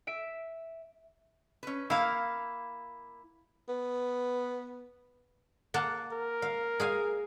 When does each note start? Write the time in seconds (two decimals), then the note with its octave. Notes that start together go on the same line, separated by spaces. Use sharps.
0.07 E5 D7
1.63 C#4 B4
1.90 A#3 E4 F5
3.69 B3
5.74 A#3 F#5 A5
6.13 A#4
6.42 F5
6.80 G#4 F5 G#5